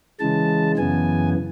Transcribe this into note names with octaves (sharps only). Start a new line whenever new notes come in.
C#3 E3 G#3 A5
F#2 C#3 E3 B3 G#5